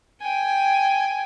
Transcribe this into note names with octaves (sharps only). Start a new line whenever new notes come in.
G5 G#5